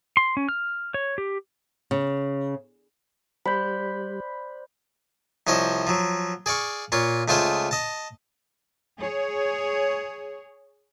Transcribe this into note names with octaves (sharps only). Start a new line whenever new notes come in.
C6
C#4
F6
C#5
G4
C#3
G3 C5 D5 B5 G6
C2 F3 C5 C#5 D#5
F3 F#3
G#4 D5 F5 C#6
A#2 F4 C#5
C#2 A3 F4 G#4 C5 D#6
D#5 A5
G#4 C#5